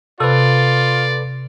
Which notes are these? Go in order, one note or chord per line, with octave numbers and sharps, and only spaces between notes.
C3 F4 A4 B4 D5